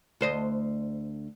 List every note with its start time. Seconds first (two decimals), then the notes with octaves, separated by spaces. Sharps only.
0.21 D2 C5 D#5